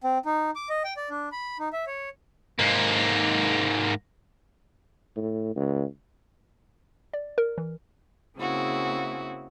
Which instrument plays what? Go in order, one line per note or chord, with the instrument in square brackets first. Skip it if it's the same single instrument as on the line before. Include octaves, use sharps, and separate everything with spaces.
[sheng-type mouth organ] C4
D#4
D6
D#5
G5
D5
D4
B5
D#4
E5
C#5
[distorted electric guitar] G#2 A#3
[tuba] A2
C#2
[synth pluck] D5
A#4
E3
[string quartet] C#3 A#3 C4 E4 F#4 G#4